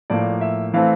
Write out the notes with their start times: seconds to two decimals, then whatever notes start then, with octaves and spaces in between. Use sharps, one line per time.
0.10 A2 F3 A#3 D5
0.41 E5
0.74 E3 A3 C4 F5